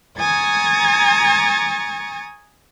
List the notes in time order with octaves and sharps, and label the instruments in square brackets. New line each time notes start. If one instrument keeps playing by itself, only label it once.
[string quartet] G#5 A#5 C#6 D#6 G#6 A6